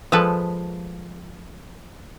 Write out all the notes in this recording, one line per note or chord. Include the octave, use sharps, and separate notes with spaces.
F3 G#3 A4 B4